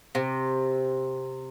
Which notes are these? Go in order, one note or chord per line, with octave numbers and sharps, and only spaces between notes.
C3